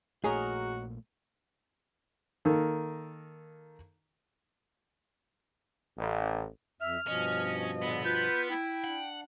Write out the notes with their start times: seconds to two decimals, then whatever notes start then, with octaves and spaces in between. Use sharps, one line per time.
0.24 A#1 A#2 A3 C#4 D#4 F#4 G#4 A#4
2.45 D#3 A#3 A4
5.99 A1
6.81 F2 E5 F6
7.07 G2 B2 F3 C#4 D#5
7.82 A#2 D3 B3
8.05 F4 B4 G6
8.49 E4 G5
8.84 D4 F#5